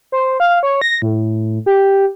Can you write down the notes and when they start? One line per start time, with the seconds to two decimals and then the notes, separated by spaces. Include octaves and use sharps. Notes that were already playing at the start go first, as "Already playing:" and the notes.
0.12 C5
0.40 F5
0.63 C#5
0.81 A#6
1.02 A2
1.66 G4